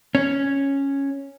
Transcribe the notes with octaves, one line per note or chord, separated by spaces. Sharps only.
C#4